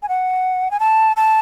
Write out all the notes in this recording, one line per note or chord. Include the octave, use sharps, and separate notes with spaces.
G#5
F#5
G#5
A5
A5